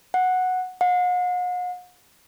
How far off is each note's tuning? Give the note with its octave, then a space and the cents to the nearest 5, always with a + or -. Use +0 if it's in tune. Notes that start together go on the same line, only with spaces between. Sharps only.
F#5 -5
F#5 -45